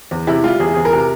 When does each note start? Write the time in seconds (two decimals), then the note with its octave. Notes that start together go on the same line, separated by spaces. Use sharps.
0.11 E2
0.27 C3 E4
0.44 G3 F4
0.60 E2 G#4
0.74 E2 G#4
0.85 A#4
0.93 C3